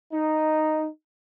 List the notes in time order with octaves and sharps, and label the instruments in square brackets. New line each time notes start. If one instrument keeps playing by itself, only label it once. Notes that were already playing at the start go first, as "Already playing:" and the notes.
[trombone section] D#4